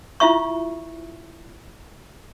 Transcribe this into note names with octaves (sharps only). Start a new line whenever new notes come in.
E4 F4 E5 C#6